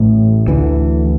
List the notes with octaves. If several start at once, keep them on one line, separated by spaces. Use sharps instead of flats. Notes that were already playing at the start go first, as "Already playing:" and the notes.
Already playing: A1 A2
D2 D3 E3